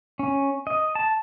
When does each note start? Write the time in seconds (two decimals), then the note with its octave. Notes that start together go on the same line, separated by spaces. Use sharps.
0.19 C#4
0.67 D#5
0.95 A5